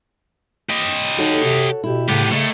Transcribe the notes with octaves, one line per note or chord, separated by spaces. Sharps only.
G4 D#5
D#4 F#4 A4 C#5
C3
B2 E4 G4
A2 C#3 B3 G4
A2 C#3 A#4 D#5